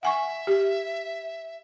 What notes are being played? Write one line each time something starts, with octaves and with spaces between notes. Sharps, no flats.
E5 F#5 G#5 C#6
G4